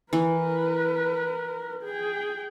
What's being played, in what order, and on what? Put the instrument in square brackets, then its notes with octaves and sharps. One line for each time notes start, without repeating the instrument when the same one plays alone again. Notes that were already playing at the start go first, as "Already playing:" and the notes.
[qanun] E3 [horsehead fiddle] A#4 B4
[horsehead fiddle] G#4 G5